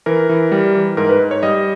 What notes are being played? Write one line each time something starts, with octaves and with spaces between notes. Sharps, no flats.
E3 A#4
E3
G3
E3
G#2 A#4
B4
G#2
C#5
G3 D#5